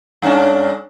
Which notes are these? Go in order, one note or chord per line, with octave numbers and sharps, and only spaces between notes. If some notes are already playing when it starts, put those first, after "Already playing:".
G2 C#4 D4